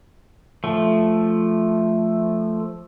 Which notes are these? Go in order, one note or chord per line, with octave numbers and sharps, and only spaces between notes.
F3 A3